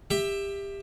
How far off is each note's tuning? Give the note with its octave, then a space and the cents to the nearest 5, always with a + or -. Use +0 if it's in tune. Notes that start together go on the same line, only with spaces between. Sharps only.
G4 +20 E5 +0